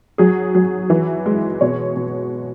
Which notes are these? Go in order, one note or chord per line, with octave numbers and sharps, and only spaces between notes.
F#3 G#4
F#3
E3
G#3
B2 C#5
B2